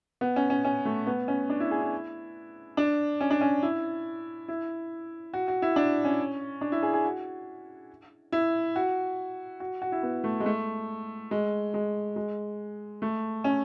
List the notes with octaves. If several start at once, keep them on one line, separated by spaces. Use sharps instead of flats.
B3
C#4
C#4
C#4
A3
B3
C#4
D4
E4
G#4
E4
D4
C#4
D4
C#4
E4
E4
F#4
F#4
E4
D4
C#4
D4
E4
G#4
G#4
F#4
E4
F#4
F#4
F#4
E4
B3
A3
G#3
A3
G#3
G#3
G#3
A3
C#4